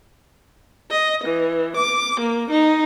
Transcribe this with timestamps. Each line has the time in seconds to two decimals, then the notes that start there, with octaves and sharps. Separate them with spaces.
0.91 D#5
1.24 E3
1.77 D6
2.20 A#3
2.51 D#4